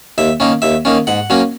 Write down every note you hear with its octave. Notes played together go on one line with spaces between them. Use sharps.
D#2 E5
D#3 A#3 C#4
D#2 E5
D#3 A#3 C#4
G#2 F#5
F#3 A#3 C#4